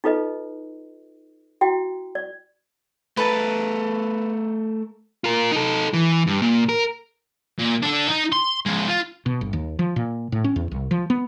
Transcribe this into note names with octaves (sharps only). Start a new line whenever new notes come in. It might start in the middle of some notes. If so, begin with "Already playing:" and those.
D#4 F4 A4 B4 D#5
E4 F#4 G5
D5
A3 A#4 B4 A5
F4 A#4
D#4 A4
E3
G2
A#2
A#4
A#2
D4 A4
D#4
C6
F3 G#3
F4
B2
G1
D#2
F3
A#2
A2
C#4
E2
C2
F3
B3